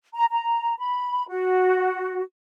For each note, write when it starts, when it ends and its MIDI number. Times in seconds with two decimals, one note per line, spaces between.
0.14 0.25 82
0.31 0.74 82
0.78 1.24 83
1.28 2.20 66